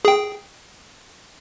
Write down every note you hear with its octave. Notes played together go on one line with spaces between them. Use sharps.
G#4 G5